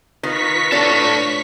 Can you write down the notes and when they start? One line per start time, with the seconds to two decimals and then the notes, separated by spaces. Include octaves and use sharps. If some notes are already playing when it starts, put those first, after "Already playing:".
0.23 D#3 F4 B4 A#5 C#6 B6
0.72 D4 A4 C#5